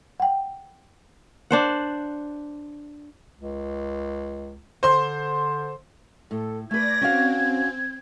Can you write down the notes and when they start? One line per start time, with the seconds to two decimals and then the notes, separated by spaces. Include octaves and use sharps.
0.20 F#5 G5
1.51 D4 C5 F#5
3.40 C#2
4.83 D3 C5 C6
6.31 A2 A4
6.71 A3 B4 D5 G#6 A#6
7.01 C4 C#4 F#4 F5